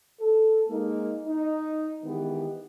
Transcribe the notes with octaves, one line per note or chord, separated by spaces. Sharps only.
A4
G#3 A#3 D#4
D#4
D#3 E3 G#3 B3 D#4 G4